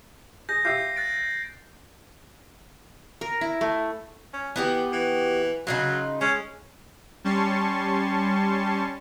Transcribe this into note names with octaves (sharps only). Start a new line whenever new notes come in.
G#4 G6 A#6
F4 G4 E5 G6 C7
F#6 A6 D7
A#4
E4
A3
C#4
E3 B3 F#4 G4
E3
C#3 F#3 D#4 F4
G#3 C#4
G3 C#4 A5 C6 C#6